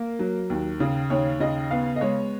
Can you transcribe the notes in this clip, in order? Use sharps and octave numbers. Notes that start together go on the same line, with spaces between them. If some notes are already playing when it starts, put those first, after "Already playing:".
Already playing: A#3 A#4
F#3
D#2
C#3
D#2 C#5
C#3 D#5
B3 F5
D#5
G#3 C#5